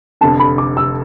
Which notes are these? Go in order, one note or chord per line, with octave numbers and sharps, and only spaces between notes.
F1 F2 D3 A5
B5
D6
E6